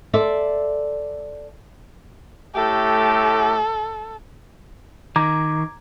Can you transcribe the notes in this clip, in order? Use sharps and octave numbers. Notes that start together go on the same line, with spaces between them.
A4 C5 D5 E5
A2 A3 G4 A4
D#3 A#5 D6 G#6